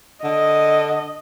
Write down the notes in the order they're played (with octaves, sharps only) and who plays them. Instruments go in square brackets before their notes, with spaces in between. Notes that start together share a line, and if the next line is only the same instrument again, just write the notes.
[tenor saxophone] D3 [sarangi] D#5